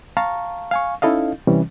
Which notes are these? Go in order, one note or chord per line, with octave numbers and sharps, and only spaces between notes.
F5 A5 A#5 C#6
F5 G#5 C#6
C#4 D#4 E4 A4 D#5 F5
C3 E3 G3 C#4